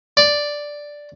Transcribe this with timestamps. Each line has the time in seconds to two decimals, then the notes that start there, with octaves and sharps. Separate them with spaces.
0.17 D5